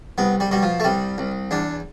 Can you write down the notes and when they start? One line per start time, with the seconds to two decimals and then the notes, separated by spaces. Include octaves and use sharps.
0.18 C2 B3
0.40 G3
0.51 B2 G3
0.63 F3
0.80 A3
0.84 C2 G3
1.18 C2
1.51 E2 D4